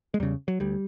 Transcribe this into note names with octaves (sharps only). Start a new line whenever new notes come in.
G#3
E2 C#3 G3
F#3
D2 G3